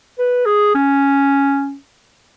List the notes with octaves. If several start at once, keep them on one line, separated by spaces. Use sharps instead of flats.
B4
G#4
C#4